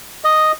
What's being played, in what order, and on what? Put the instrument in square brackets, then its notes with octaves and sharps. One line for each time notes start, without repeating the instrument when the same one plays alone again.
[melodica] D#5